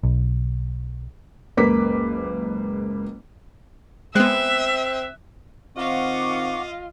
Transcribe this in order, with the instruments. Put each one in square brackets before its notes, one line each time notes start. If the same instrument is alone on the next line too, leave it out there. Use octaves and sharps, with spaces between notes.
[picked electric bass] B1
[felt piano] F#1 C#2 A#3 B4 D6 B6
[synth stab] G#3 B3 [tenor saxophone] C4 [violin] E5 [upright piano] F#6
[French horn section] D#3 C4 [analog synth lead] F4 [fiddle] D#5 F5 [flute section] F#5 C#6 D6